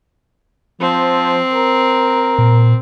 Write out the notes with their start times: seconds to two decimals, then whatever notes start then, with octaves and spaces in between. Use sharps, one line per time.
0.81 F3 C4
1.53 A#4
2.39 A#2